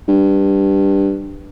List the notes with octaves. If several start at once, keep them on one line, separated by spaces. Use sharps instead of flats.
G2